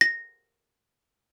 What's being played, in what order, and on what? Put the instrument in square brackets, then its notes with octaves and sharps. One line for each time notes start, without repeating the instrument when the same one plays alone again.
[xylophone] A#6